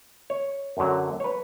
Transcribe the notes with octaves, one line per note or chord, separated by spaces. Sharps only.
C#5
F#2 D3 F#3
C#5
B4